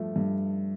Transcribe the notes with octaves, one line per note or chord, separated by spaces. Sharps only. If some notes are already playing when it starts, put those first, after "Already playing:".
Already playing: G2 F3 A3
G2